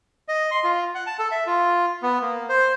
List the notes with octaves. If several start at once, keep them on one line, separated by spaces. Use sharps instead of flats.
D#5
C6
F4
F#5
A5
A4
E5
F4
B3
A#3
C5